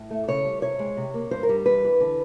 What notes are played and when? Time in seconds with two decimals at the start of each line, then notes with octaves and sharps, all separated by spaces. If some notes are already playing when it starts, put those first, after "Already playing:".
Already playing: A2
0.11 A3
0.28 C#3 C#5
0.45 G3
0.62 C3 C#5
0.79 G#3
0.97 C3
1.14 A#3
1.31 G2 C5
1.43 A#4
1.49 G3
1.66 E2 B4
1.83 E3
2.00 D3